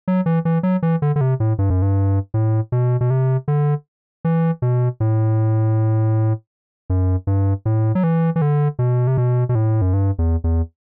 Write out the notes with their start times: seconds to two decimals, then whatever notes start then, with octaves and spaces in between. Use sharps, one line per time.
0.08 F#3
0.26 E3
0.45 E3
0.63 F#3
0.83 E3
1.02 D3
1.16 D3
1.21 C3
1.40 A2
1.59 G2
1.70 F#2
1.82 G2
2.34 A2
2.72 B2
3.01 B2
3.10 C3
3.48 D3
4.25 E3
4.62 B2
5.00 A2
6.90 F#2
7.27 G2
7.66 A2
7.95 F#3
8.04 E3
8.36 E3
8.42 D3
8.79 B2
9.07 C3
9.17 B2
9.49 B2
9.55 A2
9.82 F#2
9.93 G2
10.19 E2
10.44 E2